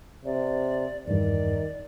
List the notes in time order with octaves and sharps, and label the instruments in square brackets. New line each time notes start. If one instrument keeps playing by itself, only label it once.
[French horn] C3 [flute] D5
[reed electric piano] E2 G2 [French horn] D#3 [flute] D5